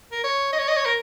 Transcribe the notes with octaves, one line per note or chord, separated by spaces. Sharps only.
A#4
C#5
D#5
C#5
D#5
C#5
A#4